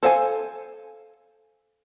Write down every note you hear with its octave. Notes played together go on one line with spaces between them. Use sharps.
A4 C5 F5 G5 G#5